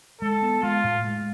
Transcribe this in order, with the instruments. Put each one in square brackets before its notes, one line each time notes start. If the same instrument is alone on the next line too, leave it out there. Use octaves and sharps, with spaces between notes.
[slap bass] G#3 [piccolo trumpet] A4
[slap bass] B3
[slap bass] G#3 [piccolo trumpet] F4
[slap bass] A2
G#3